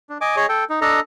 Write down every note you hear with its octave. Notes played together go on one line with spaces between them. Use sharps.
D4
D#5 G#5 D6
G#4 C#5 D#5
A4 G5
D#4
D4 A4 D#5 A#5